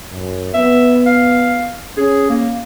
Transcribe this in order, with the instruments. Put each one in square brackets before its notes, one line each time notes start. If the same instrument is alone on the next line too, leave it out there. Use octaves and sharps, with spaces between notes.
[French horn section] F#2
[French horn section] B3 [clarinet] E5
[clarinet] F5
[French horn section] C#4 [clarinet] G#4
[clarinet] A#3